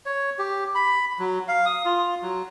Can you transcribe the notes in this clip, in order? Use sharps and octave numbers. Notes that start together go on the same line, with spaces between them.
C#5
G4
B5
F#3
F5
D#6
F4
F#3